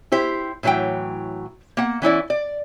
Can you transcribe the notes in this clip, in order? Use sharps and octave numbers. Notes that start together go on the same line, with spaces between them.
E4 G4 C5
A2 E3 F#3 F#5 G5
A#3 F#5
E3 C#4 E4 D5
D5